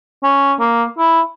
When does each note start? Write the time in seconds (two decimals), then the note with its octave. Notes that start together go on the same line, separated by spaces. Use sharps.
0.23 C#4
0.60 A#3
0.98 E4